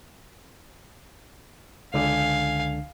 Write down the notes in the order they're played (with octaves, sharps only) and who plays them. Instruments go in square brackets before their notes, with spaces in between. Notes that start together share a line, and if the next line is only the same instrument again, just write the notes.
[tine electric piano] C#2 D3 D4 [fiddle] F5 G#5